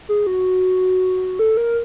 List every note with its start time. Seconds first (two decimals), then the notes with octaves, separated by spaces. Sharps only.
0.09 G#4
0.27 F#4
1.39 A4
1.57 A#4